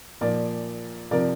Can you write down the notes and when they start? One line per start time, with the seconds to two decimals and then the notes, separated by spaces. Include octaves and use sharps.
0.21 A#2 F3 A#4 D5
1.11 C3 F3 A#4 D5